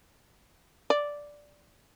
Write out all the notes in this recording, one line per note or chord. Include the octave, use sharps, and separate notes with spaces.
D5